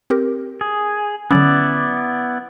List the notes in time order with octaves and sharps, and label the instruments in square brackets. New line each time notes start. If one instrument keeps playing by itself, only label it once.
[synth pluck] C4 G4 A#4
[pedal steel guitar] G#4
[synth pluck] D3 F#3 C#4 [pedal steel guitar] B3 E4 D5